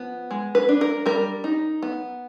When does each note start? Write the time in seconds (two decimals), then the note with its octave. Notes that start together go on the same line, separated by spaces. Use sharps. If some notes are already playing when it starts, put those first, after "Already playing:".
Already playing: F3 B3
0.31 G#3
0.55 B4
0.69 D4
0.81 A#4
1.06 G3 A#4
1.44 D#4
1.82 B3